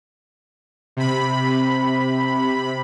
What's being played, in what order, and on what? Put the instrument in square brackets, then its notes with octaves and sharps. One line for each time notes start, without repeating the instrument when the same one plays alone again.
[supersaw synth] C3 B5